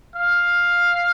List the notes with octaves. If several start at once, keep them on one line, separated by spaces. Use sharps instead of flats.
F5